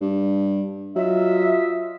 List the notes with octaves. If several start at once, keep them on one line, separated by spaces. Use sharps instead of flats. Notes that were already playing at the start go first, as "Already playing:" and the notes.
G2
F#3 F4 D#5 E5